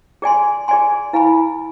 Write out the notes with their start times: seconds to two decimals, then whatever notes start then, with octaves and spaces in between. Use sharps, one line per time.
0.22 G#4 D5 G#5 C6
0.68 G#4 D5 G#5 C6
1.13 E4 B4 F5 G#5 B5